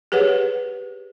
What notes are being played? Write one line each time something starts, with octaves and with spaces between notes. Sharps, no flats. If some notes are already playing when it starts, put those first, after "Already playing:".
G4 G#4 B4 C#5 F#5